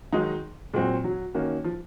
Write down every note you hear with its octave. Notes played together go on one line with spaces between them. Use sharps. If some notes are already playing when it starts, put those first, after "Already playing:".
D#3 F#3 G#3 D#4
A#2 F#3 G#3 C4 F#4
F#3
D#3 A#3 C#4 F#4
F3